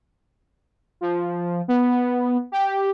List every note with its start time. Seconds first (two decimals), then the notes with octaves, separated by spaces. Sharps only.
1.01 F3
1.68 B3
2.52 G4